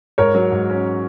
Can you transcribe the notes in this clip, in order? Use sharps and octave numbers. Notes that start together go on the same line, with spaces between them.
G#2 A#4 C#5
F#3
G#2
C#4